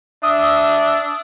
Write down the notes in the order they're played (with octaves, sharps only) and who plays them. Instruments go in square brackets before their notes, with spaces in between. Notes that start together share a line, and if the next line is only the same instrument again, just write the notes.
[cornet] D4 [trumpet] E5 [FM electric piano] D#6 E6